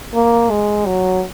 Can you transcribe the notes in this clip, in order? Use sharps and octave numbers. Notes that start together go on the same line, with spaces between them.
A#3
G#3
F#3